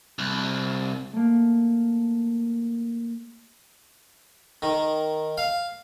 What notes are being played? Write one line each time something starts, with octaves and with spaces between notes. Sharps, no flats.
C2
A3 A#3
D#3
F5